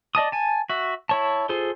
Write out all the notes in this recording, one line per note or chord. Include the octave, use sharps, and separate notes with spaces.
D5 D#5 A5 D#6
G#5 A5
F#4 E5
E4 C#5 A5
F4 G#4 A4 C5